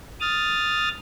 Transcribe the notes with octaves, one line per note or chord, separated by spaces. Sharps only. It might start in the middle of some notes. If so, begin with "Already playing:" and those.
D#6 F6 A6